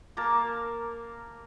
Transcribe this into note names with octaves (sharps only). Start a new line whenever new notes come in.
A#3 A#4 A5 A#5